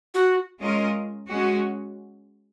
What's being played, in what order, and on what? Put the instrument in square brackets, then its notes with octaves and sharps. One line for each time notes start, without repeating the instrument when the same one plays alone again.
[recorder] F#4
[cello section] G#3 C#4 F4 A#4 D#5
G#3 C#4 F#4